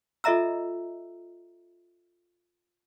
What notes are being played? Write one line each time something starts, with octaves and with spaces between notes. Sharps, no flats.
F4 A4 D#5 E5 A#5 E6